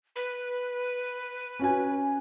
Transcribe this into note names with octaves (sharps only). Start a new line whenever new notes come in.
B4
C#4 F#4 G#5